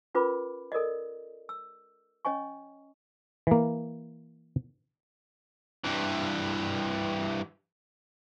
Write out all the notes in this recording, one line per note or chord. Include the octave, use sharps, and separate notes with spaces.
C#4 F4 A#4 B4 B5 D6
A4 A#4 D5 D#5
E6
C#4 C#5 D#5 G#5 C#6
E3 A#3
G2 E3